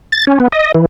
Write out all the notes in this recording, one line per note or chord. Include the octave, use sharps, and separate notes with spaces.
A6
C#4
B3
D#5
E3